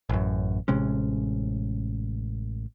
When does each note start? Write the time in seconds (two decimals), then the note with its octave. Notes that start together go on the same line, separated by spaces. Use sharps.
0.09 A1 F#2
0.68 A1 C3 G#3 C#4